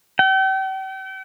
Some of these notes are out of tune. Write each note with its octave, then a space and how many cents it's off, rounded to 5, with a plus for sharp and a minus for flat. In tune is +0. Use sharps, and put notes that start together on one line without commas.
G5 -40